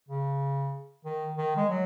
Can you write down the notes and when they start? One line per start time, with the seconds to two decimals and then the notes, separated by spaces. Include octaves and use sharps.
0.09 C#3
1.05 D#3
1.38 D#3
1.57 G#3
1.69 F#3